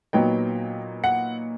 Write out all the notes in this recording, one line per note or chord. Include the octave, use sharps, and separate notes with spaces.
A#2 F#3 B3 D#4 G5
F#5